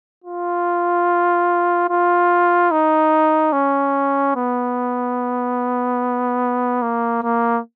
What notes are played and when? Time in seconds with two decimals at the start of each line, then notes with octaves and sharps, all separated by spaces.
0.24 F4
1.90 F4
2.71 D#4
3.53 C#4
4.36 B3
6.82 A#3
7.23 A#3